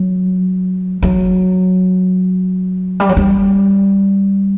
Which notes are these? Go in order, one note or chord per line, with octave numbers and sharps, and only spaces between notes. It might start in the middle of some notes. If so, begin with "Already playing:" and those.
Already playing: F#3
F#3
G3
F#3
G3